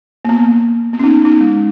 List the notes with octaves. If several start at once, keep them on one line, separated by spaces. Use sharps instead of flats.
A#3
B3
B3
C#4
B3 D#4
B3 D#4
G#3